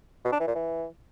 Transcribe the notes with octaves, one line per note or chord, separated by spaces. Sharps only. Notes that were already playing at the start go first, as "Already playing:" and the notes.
B2
D4
E3
A#2
E3